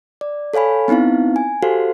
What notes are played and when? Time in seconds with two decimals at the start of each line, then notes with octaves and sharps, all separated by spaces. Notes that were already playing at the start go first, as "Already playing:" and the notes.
0.21 D5
0.54 A4 C#5 F5 G#5 B5
0.88 B3 C4 D#4 E4 F5
1.36 G#5
1.62 F#4 G4 A4 C5 F5